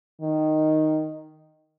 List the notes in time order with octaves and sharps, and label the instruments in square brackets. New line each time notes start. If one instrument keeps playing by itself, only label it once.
[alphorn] D#3